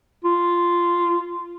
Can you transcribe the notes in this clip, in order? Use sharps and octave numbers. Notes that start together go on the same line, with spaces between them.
F4